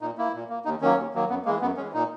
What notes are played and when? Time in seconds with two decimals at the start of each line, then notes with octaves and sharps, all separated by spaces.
0.01 A#2 D#4
0.18 A#3 E4
0.34 A#2
0.49 A#3
0.65 D#2 D#4
0.81 D#3 F#3 A#3 C#4
0.97 D#2
1.14 D#3 F#3 A#3
1.29 F#2 B3
1.45 G#3 A#3
1.48 E3
1.61 F#2 B3
1.77 E3 G#3 C#4
1.94 A#2 D#4